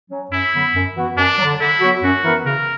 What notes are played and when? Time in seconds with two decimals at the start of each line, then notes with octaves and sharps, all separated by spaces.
0.11 F#3 C#4
0.32 F#2 E4
0.54 D3 F#3 B3
0.75 F#2
0.96 E3 B3 F#4
1.17 F#2 D4
1.39 F#3
1.44 D3
1.60 D3 E4
1.81 F#3 B3 F#4
2.03 F#2 F#4
2.24 E3 B3 E4 A#4
2.46 C#3 A#4